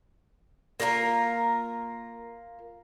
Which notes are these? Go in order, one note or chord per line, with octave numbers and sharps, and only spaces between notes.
A#3 F4 F#4 A#4